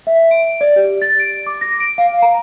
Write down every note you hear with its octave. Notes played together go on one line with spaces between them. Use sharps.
E5
D7
D5
G4
A6
D7
D6
A#6
D7
F5
A#5